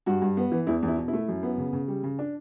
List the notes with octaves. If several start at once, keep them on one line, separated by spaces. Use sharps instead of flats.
G2 F#4
G2
B3
E3
E2 E4
E2
E4
B2
E4
A3
F#2
B3
C#3
C#3
G3
C#3
D4